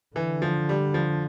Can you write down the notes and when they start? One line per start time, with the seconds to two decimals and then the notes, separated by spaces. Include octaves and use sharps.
0.16 D3 E3
0.42 F3
0.69 G3
0.94 F3